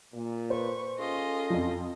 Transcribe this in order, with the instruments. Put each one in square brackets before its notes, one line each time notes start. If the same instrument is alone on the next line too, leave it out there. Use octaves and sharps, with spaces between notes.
[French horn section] A#2
[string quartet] B4 C#6 [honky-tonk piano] C5
[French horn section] C#4 G#4 A4 [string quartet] F4 D#5
[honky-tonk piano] F2 F3